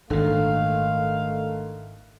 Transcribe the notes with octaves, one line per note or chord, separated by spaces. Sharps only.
G#1 A#2 D3 D#3 A3 F5